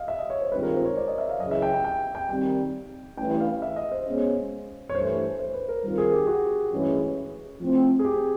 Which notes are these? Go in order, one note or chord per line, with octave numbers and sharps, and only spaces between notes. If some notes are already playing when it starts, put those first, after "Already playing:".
Already playing: D#5 F5
E5
D#5
C#5
C5
G2 D#3 G#3 C4 F4 B4
A#4
C5
C#5
D5
D#5
E5
F5
F#2 C#3 E3 D#5
E5
G5
G5
G5
G5
C3 D#3 G3 G5
A1 G2 E3 G5
F5
E5
D#5
C5
B2 G#3 C#4
C#5
G2 E3 A3 C5
C5
B4
A#4
D#3 G3 C4 F4 A#4
G#4
G4
F#4
A1 G2 E3 G#3 C#4
A2 F3 A3 C4
G#4
G4